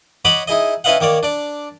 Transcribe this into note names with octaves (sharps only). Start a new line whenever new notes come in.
C#5 D#5 F#5 B5 D6 D#6
D#4 E4 G#4 D#5
C#4 E4 B4 D#5 F5 F#5
D#3 A#3 C#5 D5
D4 D5